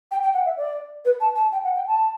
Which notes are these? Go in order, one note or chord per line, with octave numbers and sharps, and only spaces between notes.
G5
G5
F#5
E5
D5
B4
A5
A5
G5
F#5
G5
A5